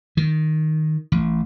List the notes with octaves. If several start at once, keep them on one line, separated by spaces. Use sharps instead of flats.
D#3
A1